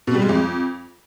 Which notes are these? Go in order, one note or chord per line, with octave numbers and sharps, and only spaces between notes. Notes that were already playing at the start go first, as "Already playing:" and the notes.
B2
G3
G#3
F2